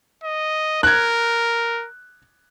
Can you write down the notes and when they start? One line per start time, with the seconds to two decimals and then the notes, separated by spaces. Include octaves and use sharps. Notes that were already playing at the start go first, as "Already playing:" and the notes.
0.24 D#5
0.83 A#4 F#6 G#6